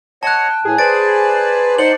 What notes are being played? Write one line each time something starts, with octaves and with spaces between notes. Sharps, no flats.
C#5 D#5 F#5 A5 F#6
G5
A2 E3 G#4
B4 C5 D5 A6 D7
D#4 C5 D5 F#5 F#7